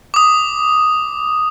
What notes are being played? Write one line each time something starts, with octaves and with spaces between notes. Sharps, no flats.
D6 D#6